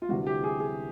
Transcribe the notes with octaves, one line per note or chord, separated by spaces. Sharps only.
F4
D2 C3 E3 G3 F#4
G4
G#4
G#4